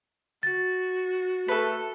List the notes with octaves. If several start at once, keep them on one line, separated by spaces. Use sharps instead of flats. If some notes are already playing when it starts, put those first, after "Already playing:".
F#4 A6
A3 A4 B4